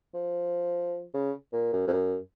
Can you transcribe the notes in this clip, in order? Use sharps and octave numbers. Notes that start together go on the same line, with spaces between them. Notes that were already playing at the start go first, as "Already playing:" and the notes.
F3
C#3
A#2
F#2
F2
F#2